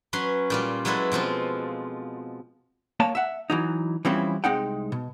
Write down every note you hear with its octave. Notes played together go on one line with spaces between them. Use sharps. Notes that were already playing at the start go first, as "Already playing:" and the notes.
F#3 C#4 B4 C6
A#2 G3 F4
F#3 G#3 E4 A4 B4
B2 F3 C4 F4
A#3 C#5 A5
E5 F#5
E3 F#3 D#4
E3 F3 G3 C4 C#4 E4
C2 G#3 C4 D#4 F#5 G5
B2